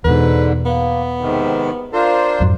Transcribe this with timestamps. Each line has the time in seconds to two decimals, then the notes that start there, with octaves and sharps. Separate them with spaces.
0.05 E2 G#2 B2 D3 B4
0.66 A#3 B3
1.21 G#2 C3 D#3
1.93 D4 F4 A#4 C5
2.40 F2 G#2 F#3